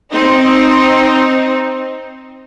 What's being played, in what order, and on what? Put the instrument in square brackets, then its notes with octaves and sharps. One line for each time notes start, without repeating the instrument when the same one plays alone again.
[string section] C4 D#4